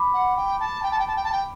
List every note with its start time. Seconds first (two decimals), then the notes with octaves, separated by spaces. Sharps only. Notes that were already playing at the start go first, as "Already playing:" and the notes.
Already playing: B5 D6
0.13 F#5
0.37 G5
0.60 A5
0.83 G5
0.91 A5
0.99 G5
1.07 A5
1.16 G5
1.24 A5
1.32 G5